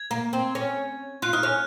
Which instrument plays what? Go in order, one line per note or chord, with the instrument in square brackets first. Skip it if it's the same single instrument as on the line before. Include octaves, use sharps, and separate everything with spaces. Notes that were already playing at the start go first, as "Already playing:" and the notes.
Already playing: [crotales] G#6
[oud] A#3
C4
C#4
[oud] F4 [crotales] F#6
[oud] D#4 [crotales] F6
[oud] C#4 [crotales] F#6